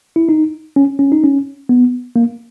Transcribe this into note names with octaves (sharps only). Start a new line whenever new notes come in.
E4
D#4
C#4
C#4
D#4
C#4
B3
A#3